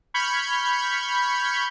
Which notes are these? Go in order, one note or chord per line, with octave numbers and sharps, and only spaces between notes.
B5 C#6 F6 G6 G#6